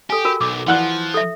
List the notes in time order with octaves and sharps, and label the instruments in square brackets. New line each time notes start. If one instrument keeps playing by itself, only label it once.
[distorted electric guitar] G4 [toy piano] A4 G#5
[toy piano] F#4 A#4
[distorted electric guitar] B1 [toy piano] D6
[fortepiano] E3 F#5 F#6 [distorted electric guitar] F3
[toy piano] A4 E5